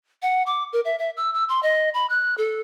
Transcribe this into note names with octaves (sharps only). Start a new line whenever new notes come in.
F#5
D6
A#4
E5
E5
E6
E6
C6
D#5
B5
F#6
A4